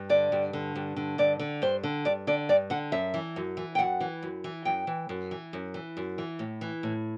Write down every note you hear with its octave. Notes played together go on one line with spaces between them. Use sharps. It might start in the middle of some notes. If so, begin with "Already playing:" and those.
Already playing: G2
D3 D5
G2
D3
G2
D3
G2 D5
D3
G2 C5
D3
G2 D5
D3 D5
G2 D5
D3 F#5
F#2 E5
E3
F#2
E3
G5
F#2 F#5
E3
F#2
E3
F#2 G5
E3
F#2
E3
F#2
E3
F#2
E3
A2
E3
A2